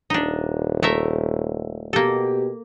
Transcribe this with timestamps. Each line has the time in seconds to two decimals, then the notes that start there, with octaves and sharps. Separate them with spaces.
0.10 D#1 D4 D#4
0.83 A3 A#4 E5
1.93 B2 A#3 G4 A4